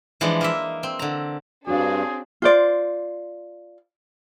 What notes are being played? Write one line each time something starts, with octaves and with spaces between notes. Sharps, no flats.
E3 F3 G#3 D4
A#3 D#5 E5
C4
D3 A#5
G2 C4 D4 F#4 G#4 C#5 F5
F4 C5 D5